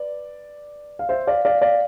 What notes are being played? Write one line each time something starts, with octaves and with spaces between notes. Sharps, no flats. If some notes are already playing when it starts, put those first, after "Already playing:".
Already playing: B4 D5
F5
C5 E5
D5 F5
D5 F5
D5 F5